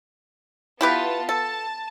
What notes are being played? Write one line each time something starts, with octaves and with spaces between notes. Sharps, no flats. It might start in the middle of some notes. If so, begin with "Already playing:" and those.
B3 E4 F4 G4 B4 A5
A4 A5